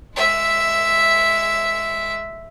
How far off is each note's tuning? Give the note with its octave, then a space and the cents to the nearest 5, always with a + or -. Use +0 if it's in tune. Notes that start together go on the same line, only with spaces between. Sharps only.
G#3 +0 E5 +0